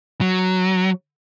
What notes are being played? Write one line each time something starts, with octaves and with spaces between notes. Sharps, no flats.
F#3